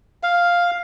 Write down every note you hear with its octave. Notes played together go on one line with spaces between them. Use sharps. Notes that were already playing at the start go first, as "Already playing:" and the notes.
F5